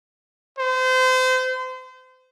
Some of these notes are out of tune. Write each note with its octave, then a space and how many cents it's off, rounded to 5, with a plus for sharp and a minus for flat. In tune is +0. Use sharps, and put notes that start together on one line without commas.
C5 -30